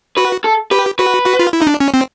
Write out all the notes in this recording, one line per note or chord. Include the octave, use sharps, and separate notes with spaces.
F#4 B4
A4
G4 B4
F#4 B4
F#4
F4
E4
D#4
D4
C#4
C4